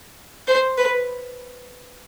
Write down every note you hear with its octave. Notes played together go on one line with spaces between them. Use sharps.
C5
B4